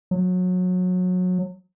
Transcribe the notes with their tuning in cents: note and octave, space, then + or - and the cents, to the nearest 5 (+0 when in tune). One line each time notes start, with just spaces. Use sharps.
F#3 -25